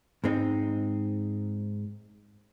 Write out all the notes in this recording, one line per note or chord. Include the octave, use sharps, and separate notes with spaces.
G#2 G#3 C4 D#4